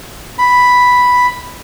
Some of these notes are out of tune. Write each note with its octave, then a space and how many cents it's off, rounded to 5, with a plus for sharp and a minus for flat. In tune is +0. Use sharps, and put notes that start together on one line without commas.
B5 +0